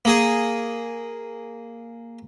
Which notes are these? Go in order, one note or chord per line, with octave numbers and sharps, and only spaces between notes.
A#3 G#4